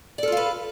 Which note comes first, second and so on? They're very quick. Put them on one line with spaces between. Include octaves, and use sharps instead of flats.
D5 A4 F4 F5 B4